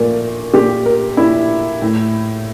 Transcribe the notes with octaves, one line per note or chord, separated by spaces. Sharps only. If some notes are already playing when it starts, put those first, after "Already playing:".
Already playing: A#2 A3 A#3
A#2 G4
A#4
A#2 E4
A2